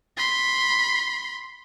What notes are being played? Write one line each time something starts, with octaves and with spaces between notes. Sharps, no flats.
B5 C6